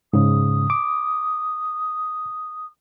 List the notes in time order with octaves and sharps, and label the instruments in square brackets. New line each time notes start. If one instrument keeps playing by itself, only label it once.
[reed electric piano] G#2 C#3 [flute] D#6
[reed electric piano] D6